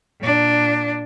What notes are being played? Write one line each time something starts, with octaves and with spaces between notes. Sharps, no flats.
A#2 D4